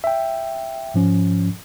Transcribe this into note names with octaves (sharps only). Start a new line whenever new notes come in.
E5 G5
G#2 F3 C#4